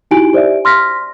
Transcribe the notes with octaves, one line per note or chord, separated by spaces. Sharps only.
D#4 E4 F#4 G4 G#5 D7
G4 C5 D5 E5
C6 F6 A#6 B6